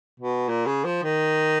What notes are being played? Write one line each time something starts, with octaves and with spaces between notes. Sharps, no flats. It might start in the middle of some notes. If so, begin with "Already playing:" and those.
B2
A#2
C#3
F3
D#3